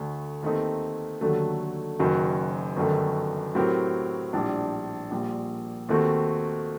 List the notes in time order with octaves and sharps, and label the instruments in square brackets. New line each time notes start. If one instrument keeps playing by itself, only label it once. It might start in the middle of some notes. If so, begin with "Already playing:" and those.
Already playing: [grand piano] D2 D3 A3
D#2 D#3 A3 C4 D#4
D#2 D3 F#3 A3
F#1 F#2 D#3 F#3
G1 F#2 D#3 A3
A2 F#3 C4 G4 A#4
A#1 A2 G3 D4
A#1 A#2 G3
D#2 D#3 A3 C4 F#4